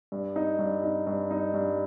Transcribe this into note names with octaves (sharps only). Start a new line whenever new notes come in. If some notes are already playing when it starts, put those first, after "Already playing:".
G2
D#4
G2
D#4
G2
D#4
G2